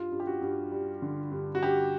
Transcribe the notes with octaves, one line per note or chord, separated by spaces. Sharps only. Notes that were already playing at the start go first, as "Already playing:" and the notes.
Already playing: G2 F4
G2
G4
F#4
G2
G3
D3
G2
F#4
G2 G4